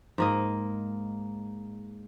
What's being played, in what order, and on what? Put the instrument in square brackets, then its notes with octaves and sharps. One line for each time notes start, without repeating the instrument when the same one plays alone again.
[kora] G#2 A#3 D#5